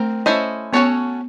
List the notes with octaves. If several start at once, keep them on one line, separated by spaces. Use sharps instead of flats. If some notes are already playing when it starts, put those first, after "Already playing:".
Already playing: A3 C4 A#4
C#4 E4 A4 C5 D#5
B3 C#4 F#4 A4 C#5